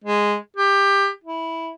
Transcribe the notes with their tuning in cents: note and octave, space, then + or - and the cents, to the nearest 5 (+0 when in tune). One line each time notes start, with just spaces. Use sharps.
G#3 -5
G4 +20
E4 -10